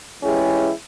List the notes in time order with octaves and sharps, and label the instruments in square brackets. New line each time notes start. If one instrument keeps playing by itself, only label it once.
[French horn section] E3 G#3 C#4 E4 G4 G#4